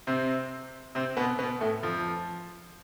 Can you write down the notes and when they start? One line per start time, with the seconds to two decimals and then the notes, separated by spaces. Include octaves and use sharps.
0.07 C3 C4
0.95 C3 C4
1.17 B2 B3
1.38 B2 B3
1.61 A2 A3
1.83 F2 F3